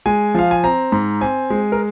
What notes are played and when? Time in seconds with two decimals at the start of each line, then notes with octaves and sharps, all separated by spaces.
0.06 G#3 G#5
0.34 F3 F5
0.51 G#5
0.64 C4 A#5
0.92 G#2
1.21 C4 G#5
1.50 G#3
1.72 A#4